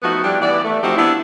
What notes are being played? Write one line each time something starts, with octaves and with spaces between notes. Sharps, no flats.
F3 A3 B3 D#4 F#4
G3 A3 D4 E4 G4
E3 B3 D5
A3
F3 C4 D#4 F#4 G4
B3 D4 E4